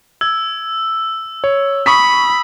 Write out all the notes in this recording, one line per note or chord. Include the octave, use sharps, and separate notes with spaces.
E6 G#6
C#5
B5 C#6 D#6 B6